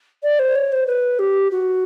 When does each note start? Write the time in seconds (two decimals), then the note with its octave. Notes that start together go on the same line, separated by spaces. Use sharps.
0.23 D5
0.39 C5
0.56 C#5
0.72 C5
0.87 B4
1.19 G4
1.51 F#4